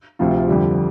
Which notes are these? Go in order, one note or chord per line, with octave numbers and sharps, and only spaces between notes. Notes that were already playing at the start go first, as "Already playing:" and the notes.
D2 C3 F3 C4 F4
F2 D3 G3